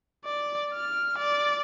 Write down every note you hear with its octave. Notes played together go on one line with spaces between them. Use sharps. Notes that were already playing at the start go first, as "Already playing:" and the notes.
D5
F6
D5